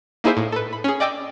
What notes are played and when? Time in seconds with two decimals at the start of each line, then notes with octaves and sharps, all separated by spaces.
0.24 A#3 D#4 E4 G#4 C5 E5
0.37 A2
0.52 A4 B4
0.73 B5
0.84 C#4 G#4
1.00 D5 D#5 G5 D6 E6